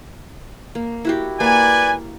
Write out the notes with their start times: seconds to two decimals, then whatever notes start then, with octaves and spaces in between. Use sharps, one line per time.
0.75 A#3
1.05 E4 F#4 G4
1.40 A#3 B4 D5 G#5